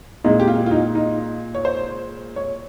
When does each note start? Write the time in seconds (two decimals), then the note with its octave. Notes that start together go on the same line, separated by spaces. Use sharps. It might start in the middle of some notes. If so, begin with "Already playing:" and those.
0.24 A#2 G#3 D#4
0.40 G4
0.48 F4
0.66 F4
0.71 D#4
0.95 D#4
1.55 C#5
1.65 C5
2.36 C#5